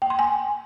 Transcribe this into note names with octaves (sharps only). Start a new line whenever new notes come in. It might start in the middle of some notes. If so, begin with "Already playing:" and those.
G5
C6
G#5